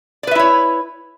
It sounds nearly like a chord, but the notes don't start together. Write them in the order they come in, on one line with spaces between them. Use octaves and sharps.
D5 B4 E5 E4 C#5